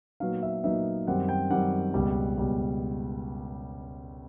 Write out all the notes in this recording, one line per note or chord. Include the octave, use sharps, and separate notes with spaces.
A#2 F#3 B3 D#4 F5
E5
A#2 F#3 B3 D#4 E5
F#2 D#3 G3 C4 F#5
G5
F#2 D#3 G3 C4 F#5
C#2 B2 G3
C#2 B2 G3